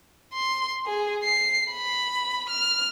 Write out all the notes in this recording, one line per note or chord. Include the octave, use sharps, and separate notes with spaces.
C6
G#4
C7
B5
F6